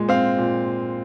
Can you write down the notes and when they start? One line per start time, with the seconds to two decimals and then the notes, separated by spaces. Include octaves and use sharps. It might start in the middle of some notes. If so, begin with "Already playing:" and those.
Already playing: A#2 G#3
0.09 C4 F5
0.38 A#2